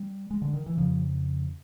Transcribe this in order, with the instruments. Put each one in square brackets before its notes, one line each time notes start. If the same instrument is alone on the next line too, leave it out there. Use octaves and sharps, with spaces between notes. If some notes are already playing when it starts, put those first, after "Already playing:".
Already playing: [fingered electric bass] G3
G#3
D3
D#3
E3
F2 C#3 F3